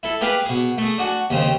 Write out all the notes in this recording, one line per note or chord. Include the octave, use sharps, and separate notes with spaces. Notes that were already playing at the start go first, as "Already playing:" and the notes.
E4 A4
G4 G#4 B4 F5 G#5 D6
B2 G#4
A3 G#4
D4 F#4 G#5
D#2 C#3 C4